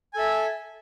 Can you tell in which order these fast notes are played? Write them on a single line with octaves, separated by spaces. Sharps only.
G#5 A4 E5